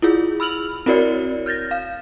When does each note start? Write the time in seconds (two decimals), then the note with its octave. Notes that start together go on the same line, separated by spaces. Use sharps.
0.02 E4 F4 G#4
0.40 B5 E6 F6 F7 F#7
0.86 C4 E4 F#4 A#4 C#5 D5
1.46 F6 G6 A6 A#6
1.71 F5